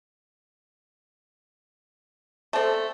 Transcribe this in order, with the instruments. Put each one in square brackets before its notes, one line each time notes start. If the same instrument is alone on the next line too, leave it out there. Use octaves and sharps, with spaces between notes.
[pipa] A3 C4 [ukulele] A4 D5 A5